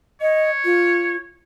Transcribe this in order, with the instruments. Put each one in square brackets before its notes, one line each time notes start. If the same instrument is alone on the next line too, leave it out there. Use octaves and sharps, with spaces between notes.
[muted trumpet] C#5 [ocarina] D#5
[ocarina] F4